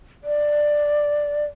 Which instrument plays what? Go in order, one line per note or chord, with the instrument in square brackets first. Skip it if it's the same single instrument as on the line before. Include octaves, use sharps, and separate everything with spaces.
[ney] D5